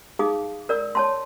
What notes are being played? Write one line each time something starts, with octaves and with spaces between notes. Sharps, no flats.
D#4 G#4 F5 D6 D#6
A#4 D5 E6
C#5 A5 C6